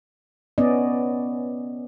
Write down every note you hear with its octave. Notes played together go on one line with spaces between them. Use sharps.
B3 C#4 D5 D#5